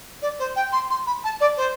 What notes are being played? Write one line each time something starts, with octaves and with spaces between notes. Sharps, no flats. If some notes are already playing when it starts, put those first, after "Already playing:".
D5
C5
G5
C6
C6
B5
A5
D5
C5